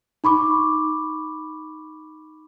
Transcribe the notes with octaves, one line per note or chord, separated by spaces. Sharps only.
D#4 B5 C#6 D6